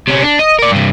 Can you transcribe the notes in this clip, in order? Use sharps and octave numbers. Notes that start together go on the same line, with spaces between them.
C3 C#4
D4
D#5
A#4 D5
G2 C3